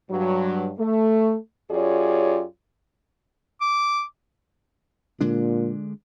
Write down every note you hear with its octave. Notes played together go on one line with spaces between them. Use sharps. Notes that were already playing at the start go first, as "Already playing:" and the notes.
G2 F#3
A3
F#2 F4 G4 G#4 C#5 D5
D6
A#2 D3 G#3 D4